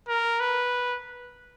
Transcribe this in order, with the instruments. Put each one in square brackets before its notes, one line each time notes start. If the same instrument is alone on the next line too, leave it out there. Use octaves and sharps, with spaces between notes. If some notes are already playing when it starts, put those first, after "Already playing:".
[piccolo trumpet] A#4
B4